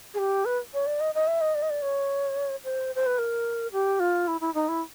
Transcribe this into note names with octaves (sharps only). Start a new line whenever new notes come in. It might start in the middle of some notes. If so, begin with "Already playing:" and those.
G#4
G4
B4
C#5
D5
D#5
D#5
E5
D#5
D5
D#5
D5
C#5
C5
C5
B4
A#4
G4
F4
E4
E4
D#4
E4